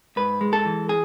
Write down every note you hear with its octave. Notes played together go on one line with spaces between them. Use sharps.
G#2 B4
G#3
A4
E3
G#4